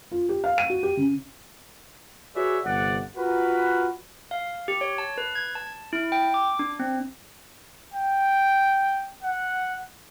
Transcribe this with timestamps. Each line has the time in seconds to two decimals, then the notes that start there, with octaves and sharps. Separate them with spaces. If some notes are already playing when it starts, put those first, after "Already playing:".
0.11 F4
0.29 G4
0.44 F5
0.58 D#7
0.70 F#4
0.83 G4
0.97 C#3
2.35 F#4 G#4 B4 C#5 D5 E5
2.64 G1 C3 D5 F#5
3.17 F4 F#4 A#4 B4
4.31 F5
4.68 G4
4.81 C#5
4.98 A5
5.18 B4
5.35 G#6
5.55 A5
5.93 E4
6.12 G5
6.34 D6
6.59 D4
6.80 C4
7.94 G5
9.23 F#5